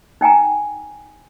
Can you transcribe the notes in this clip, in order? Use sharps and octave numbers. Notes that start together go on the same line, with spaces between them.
D#4 G5 G#5 A#5